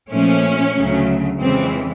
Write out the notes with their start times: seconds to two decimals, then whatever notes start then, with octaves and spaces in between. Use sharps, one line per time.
0.09 A#2 F3 A3 C#4
0.74 D2 C#3 F#3 A3
1.39 F2 C#3 E3 G#3 C4